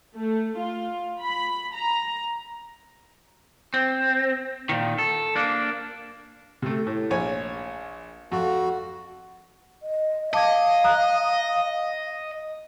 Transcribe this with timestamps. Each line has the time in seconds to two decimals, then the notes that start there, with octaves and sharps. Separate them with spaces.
0.15 A3
0.59 F4
1.22 B5
1.75 A#5
3.74 C4
4.69 A#2 D#3
4.98 A4
5.36 A#3 D4
6.62 C3 A3
6.86 A2
7.10 A#1 C#5 G#5
8.32 F2 F#4
9.83 D#5
10.33 D#5 F5 A5 D6 G#6
10.84 A#5 D#6 F#6